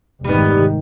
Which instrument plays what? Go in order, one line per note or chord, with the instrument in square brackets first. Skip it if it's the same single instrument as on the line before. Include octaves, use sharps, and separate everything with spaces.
[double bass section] F1 G#2 D#3 [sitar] G3 B3